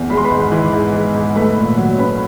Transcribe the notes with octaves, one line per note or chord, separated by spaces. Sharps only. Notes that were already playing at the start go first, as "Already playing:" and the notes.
Already playing: E2
G#3 B5
C6
B4 B5
G#2
E3
G#2
G#3
G#2
A3 B4 B5
A#2
F#3
C#4 B4 B5